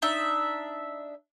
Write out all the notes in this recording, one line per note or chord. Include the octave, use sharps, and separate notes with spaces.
D4 D#4 E5